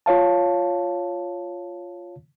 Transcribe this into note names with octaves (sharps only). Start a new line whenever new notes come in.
F4 C#5 F5 A5